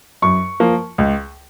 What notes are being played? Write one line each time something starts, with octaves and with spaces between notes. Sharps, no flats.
F#2 C#6
F3 A#3
C#2